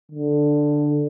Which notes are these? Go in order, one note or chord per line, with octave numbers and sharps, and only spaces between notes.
D3